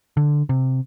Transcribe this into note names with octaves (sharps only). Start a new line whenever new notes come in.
D3
C3